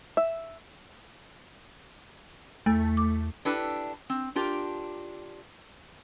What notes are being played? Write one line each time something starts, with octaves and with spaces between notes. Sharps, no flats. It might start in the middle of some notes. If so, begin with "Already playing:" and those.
E5
E2 A3
D6
D4 E4 G4 A4 B4
C4
D4 F4 G4 A#4